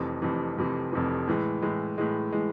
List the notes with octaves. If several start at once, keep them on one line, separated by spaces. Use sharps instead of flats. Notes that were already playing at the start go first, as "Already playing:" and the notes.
Already playing: F1 F2 C3 E3
F1 F2 C3 E3
F1 F2 C3 E3
F1 F2 C3 E3
A2 E3 G#3
A2 E3 G#3
A2 E3 G#3
A2 E3 G#3